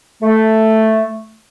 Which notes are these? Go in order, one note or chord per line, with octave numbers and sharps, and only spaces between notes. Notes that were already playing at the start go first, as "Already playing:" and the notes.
A3